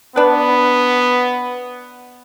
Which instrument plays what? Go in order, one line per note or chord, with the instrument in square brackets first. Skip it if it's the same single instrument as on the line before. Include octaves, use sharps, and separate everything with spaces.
[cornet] B3 [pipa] D4 B4